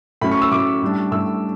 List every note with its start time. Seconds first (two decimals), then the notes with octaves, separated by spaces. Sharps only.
0.21 A2 F#3 C#4 B5
0.31 C#6
0.42 E6
0.51 A2 F#3 C#4 D6
0.82 A2 G3 D4
1.12 A2 G3 D4 E6